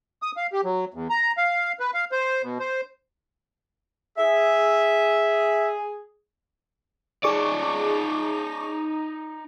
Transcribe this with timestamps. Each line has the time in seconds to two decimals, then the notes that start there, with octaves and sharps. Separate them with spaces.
0.22 D#6
0.37 F5
0.52 G4
0.64 F#3
0.94 E2
1.10 A#5
1.37 F5
1.80 B4
1.94 F5
2.12 C5
2.43 B2
2.59 C5
4.18 G#4 E5
7.24 D#4 G#4 D5 C#6 D6